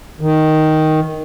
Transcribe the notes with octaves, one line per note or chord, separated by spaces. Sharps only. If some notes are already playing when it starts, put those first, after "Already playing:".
D#3